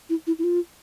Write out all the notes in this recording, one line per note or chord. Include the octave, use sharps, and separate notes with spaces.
E4
E4
E4
F4